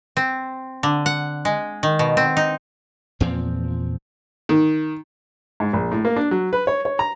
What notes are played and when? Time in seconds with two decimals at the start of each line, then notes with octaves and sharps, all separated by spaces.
0.17 C4
0.83 D3
1.06 F#5
1.45 G#3
1.83 D#3
1.99 B2
2.17 C4
2.37 D#4
3.20 E2 A#2 F3 C4
4.49 D#3
5.60 G#2
5.73 A#1
5.91 A2
6.05 A#3
6.16 D4
6.31 F#3
6.53 B4
6.67 C#5
6.85 C#5
6.99 A#5